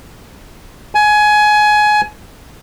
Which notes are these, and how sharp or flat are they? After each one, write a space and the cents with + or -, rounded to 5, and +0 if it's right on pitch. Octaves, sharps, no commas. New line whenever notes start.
G#5 +20